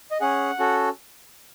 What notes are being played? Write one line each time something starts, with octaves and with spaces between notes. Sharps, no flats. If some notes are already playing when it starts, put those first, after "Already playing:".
D#5
C#4 G#4 F#5
C#4 F#4 A4